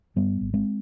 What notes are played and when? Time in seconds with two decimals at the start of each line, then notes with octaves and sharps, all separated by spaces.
0.16 G2 G3 B3
0.41 G#1
0.54 G#3 C4